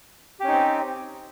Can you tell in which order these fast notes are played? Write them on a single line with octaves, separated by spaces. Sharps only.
G4 C#4 D#4 C4